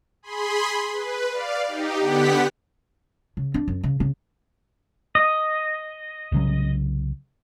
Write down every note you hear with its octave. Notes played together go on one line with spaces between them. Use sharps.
G#4 B5 C6
B4
D5 F5
D#4 G4
D3 B3 G4 F#5 B6
C#3
D4
F#2
C#3
C#3
D#5
C2 C#3 F#3